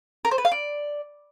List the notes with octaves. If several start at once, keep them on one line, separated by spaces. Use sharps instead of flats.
A#4
C5
B4
F5
D5